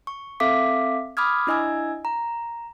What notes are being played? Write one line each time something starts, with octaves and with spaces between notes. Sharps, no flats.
C#6
C4 A4 E5 F5 D6 B6
B5 D6 D#6 F6 G#6
D4 E4 D#5 G#5 E6 G#6
A#5